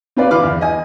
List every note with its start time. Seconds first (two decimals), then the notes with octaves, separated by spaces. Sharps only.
0.17 C4 F4 B4 D5
0.31 E3 F4 F5 B5 D6 F6
0.43 E2
0.61 D#5 G#5